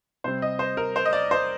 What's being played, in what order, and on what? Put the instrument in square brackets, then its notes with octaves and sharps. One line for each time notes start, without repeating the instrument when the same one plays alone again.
[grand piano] C3 G3 C4 C5
D#5
C5
A#4
C5
D#5
D5
C5